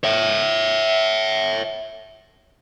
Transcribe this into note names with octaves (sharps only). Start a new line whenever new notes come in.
C#5 E5